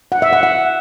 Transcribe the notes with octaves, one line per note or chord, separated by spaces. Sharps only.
F#5
E5
F#5
F#5